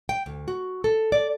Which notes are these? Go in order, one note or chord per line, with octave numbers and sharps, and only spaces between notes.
G5
D2
F#4
A4
D5